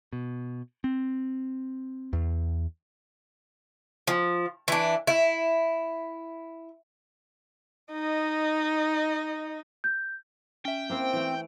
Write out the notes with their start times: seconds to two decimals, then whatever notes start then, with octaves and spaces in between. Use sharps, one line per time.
0.13 B2
0.84 C4
2.13 E2
4.07 F3
4.68 E3 D4
5.07 E4
7.92 D#4 D#5
9.84 G6
10.65 C#4 E5 G5
10.90 A#3 C4 E4 C5
11.13 E3 A3 D7